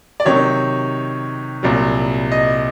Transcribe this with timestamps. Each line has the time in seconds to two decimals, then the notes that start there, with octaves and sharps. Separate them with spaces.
0.20 D5
0.25 C3 D#3 F#3 C#5
1.63 C2 A#2 F#3
2.32 D#5